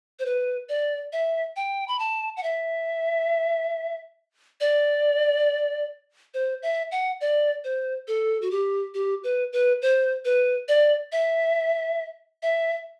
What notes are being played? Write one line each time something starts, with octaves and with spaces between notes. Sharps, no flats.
C5
B4
D5
E5
G5
B5
A5
F#5
E5
D5
C5
E5
F#5
D5
C5
A4
F#4
G4
G4
B4
B4
C5
B4
D5
E5
E5